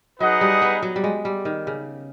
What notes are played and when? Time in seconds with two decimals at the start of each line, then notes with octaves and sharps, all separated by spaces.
0.19 F#3 D#4 G#4 B4 D#5 F#5
0.41 G3
0.62 B3
0.82 F#3
0.96 G3
1.04 G#3
1.25 G3
1.45 D#3
1.67 C#3